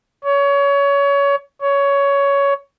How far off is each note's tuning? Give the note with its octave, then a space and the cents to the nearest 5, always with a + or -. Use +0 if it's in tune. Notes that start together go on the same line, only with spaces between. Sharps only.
C#5 +25
C#5 +15